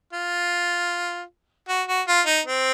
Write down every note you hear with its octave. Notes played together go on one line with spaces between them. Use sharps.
F4
F#4
F#4
F4
D#4
C4